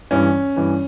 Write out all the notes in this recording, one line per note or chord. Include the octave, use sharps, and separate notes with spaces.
G2 E3 C#4
G2 E3